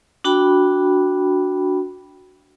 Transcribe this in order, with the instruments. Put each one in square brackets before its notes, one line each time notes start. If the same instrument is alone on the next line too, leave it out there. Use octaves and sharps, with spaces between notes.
[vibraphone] D4 F#4 G5 B5